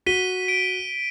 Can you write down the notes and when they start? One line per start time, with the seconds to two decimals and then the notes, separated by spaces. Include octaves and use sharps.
0.06 F#4 B6 D#7 G7
0.48 D7